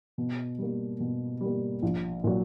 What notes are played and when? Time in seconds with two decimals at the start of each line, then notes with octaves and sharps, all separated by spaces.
0.18 B2
0.58 G3 A#3
1.00 B2
1.41 G3 A#3
1.83 A#1
2.24 A#2 F#3